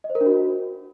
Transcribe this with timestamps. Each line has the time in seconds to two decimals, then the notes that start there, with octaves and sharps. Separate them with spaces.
0.04 D#5
0.10 C5
0.15 A#4
0.21 D4
0.26 F#4